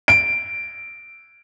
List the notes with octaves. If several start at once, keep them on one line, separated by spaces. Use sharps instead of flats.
D7